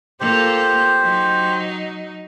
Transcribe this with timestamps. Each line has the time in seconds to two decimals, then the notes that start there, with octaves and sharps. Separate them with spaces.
0.20 A#3 F4 G4 A4 C5
1.01 F#3 D#4